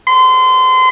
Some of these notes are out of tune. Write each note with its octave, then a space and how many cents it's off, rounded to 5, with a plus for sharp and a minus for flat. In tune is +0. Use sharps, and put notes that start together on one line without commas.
C6 -30